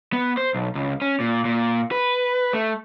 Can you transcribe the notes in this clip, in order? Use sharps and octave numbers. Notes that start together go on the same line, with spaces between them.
B3
C5
B1
C#2
C#4
A#2
A#2
B4
A3